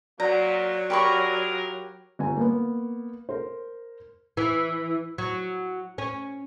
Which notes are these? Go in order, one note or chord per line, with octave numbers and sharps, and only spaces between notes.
A#2 F#3 A#3 D5 F#5 A#5
F4 G4 G#4 A#4 B5 C#6
G1 G#5
A#3 B3
A#4 C5
E3
F#3
C#4